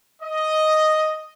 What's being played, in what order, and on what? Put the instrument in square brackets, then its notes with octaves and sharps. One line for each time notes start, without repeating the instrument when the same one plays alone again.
[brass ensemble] D#5